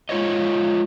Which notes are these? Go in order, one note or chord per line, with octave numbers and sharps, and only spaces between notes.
G#3 F4 C5 C#5 D#5